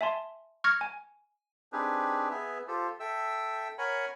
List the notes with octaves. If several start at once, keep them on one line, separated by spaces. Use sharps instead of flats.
E5 G#5 A5 C6
C#6 F6 G#6 A#6 C#7
G#5
C4 D4 D#4 G4 G#4 B4
B3 G#4 B4 E5
F4 G4 A4 C5
A4 E5 G5 E6
A#4 C#5 F#5 G#5 A#5 B5